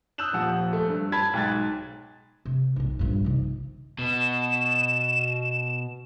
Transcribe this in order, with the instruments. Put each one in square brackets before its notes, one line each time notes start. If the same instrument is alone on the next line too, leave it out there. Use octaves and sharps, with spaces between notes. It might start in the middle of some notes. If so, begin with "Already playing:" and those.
[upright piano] D#6 E6 F#6 G6 E7 F#7
D#1 F3 F#5 D#6
A3
G2
A5 B5 G#6 B6
B1 G#2 G5 F#6 G#6 A6
[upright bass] C3
B1 C4
A#1 G2
C3 D#3
[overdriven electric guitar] B2 [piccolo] E7